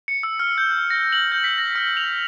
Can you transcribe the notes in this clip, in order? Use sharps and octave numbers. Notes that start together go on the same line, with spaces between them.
C#7
E6
F6
G6
A#6
F#7
G6
B6
A#6
F6
F7